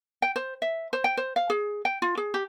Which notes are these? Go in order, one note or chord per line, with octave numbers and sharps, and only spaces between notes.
G5
C5
E5
C5
G5
C5
F5
G#4
G5
F4
G#4
G4